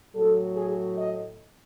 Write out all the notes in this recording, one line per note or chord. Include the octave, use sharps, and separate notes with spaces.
A2 F#3 A4
G#4
D#5